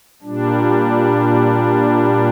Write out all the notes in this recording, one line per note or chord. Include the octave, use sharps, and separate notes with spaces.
A#2 G3 D4